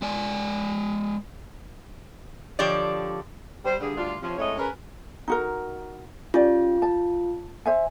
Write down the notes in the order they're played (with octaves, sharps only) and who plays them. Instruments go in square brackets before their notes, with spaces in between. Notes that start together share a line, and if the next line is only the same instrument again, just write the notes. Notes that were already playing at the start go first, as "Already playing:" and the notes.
[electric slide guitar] G#3 D5 G#5
[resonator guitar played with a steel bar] D3 F3 G4 C#5 D5
[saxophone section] G3 C5
G2 D3 G#4
D2 G2 D4 F4
C3 F3 C#4
F2 A2 G#3 A3 C#5 D#5
C#4 G#4 A#4 B4
[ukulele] D#4 F#4 A#4
[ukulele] C#4 G4 D5 [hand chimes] F4
[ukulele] A5
C5 E5 G#5